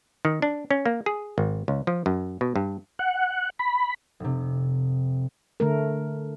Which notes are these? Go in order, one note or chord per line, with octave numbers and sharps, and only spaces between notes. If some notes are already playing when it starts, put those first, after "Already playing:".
D#3
D4
C#4
A#3
G#4
G#1
C#2
F3
F#2
B2
G2
F#5
B5
F1 C3
D3 A3 A#4